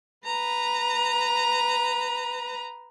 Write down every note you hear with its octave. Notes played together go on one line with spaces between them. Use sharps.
B4 A#5